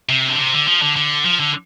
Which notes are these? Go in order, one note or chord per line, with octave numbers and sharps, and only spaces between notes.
C3
D3
C3
D3
F3
D3
D3
F3
D3